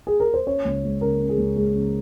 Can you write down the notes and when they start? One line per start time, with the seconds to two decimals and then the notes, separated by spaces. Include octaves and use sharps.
0.07 G#4
0.20 A#4
0.34 C5
0.47 C#4 C#5
0.65 C#2
0.84 G#3
1.01 C#3 A#4
1.20 C#4
1.29 G#4
1.38 C#2
1.56 G#3 G#4
1.75 C#3